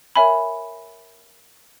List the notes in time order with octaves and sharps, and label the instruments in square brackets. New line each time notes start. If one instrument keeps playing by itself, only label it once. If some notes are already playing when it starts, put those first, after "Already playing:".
[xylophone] A#4 C#5 E5 G#5 B5